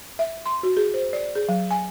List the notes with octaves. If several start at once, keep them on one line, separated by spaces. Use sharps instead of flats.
E5
C6
F#4
G#4
C5
D5
G#4
F#3
G#5